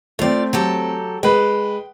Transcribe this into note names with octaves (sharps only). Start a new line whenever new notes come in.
A3 C4 F4 D5
F#3 G4 A4
G#3 B4 G5